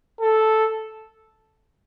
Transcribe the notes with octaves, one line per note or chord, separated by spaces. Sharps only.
A4